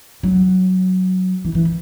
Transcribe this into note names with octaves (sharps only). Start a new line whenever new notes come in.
F#3
E3
E3